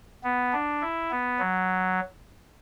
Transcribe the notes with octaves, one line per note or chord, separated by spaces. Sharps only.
B3
D4
E4
B3
F#3